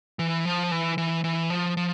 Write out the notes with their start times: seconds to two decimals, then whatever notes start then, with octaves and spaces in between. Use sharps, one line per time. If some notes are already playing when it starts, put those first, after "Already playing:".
0.19 E3
0.45 F3
0.71 E3
0.98 E3
1.24 E3
1.50 F3
1.77 F3